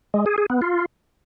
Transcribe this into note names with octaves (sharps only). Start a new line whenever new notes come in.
G#3
G#4
G#4
B3
F4